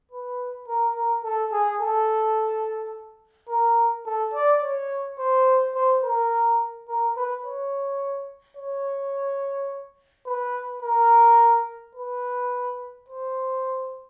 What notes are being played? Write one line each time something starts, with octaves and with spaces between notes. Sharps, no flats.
B4
A#4
A#4
A4
G#4
A4
A#4
A4
D5
C#5
C5
C5
A#4
A#4
B4
C#5
C#5
B4
A#4
B4
C5